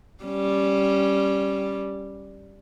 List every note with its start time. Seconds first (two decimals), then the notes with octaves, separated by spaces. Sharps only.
0.24 G3 C#4